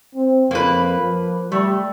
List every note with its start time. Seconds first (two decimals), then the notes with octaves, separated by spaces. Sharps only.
0.15 C4
0.51 F2 A#3 B4
0.98 F3
1.52 G3 A3